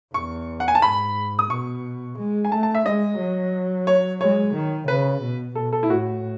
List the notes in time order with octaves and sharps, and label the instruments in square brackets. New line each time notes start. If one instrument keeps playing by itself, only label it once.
[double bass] E2 [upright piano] C#6
[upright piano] F#5
G#5
A5
[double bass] G#2 [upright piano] B5
[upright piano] D#6
[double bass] B2 [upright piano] C#6
[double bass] G#3
[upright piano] G#5
[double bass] A3 [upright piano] A5
[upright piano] A5
E5
[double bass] G#3 [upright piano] D#5
[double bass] F#3
[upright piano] C#5
[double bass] G#3 [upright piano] C#5
[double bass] D#3
[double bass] C#3 [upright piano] B4
[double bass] B2
[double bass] B2 [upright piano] A4
[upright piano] A4
E4
[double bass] A2 [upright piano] F#4